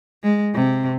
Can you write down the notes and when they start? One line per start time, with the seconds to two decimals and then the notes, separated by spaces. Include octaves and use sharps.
0.23 G#3
0.54 C3